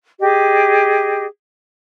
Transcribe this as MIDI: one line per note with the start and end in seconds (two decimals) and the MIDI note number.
0.20 1.24 67
0.20 1.24 68
0.20 1.24 75